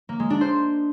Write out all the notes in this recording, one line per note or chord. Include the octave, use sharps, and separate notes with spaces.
A#3
G#3
D4
C5